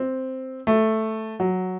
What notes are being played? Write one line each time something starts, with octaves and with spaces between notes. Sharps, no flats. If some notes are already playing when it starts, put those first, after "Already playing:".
Already playing: C4
A3
F#3